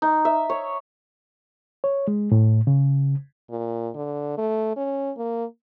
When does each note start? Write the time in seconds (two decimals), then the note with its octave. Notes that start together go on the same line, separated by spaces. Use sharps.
0.02 D#4
0.25 E5
0.50 C#5
1.84 C#5
2.08 G#3
2.32 A2
2.67 C#3
3.50 A#2
3.95 D3
4.38 A3
4.76 C#4
5.17 A#3